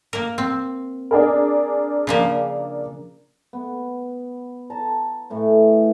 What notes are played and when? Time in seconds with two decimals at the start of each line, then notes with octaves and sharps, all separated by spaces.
0.13 A#3 A#4
0.38 C4
1.11 D4 G#4 A#4
2.07 C#3 F3 A#3
3.53 B3
4.70 A5 A#5
5.30 A2 E3